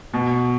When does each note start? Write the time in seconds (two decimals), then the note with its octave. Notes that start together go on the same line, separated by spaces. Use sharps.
0.14 B2